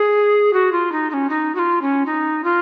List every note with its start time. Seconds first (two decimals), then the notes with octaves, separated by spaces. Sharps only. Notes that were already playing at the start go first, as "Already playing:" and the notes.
Already playing: G#4
0.53 F#4
0.72 F4
0.92 D#4
1.10 D#4
1.14 C#4
1.29 D#4
1.55 F#4
1.59 F4
1.81 C#4
2.06 D#4
2.44 F4